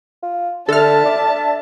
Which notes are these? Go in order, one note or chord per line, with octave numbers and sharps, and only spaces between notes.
F4
D3 A4 D5 E5 A5 F6
D4